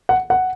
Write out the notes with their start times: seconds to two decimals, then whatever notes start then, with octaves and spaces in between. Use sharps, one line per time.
0.09 F#5
0.30 F#5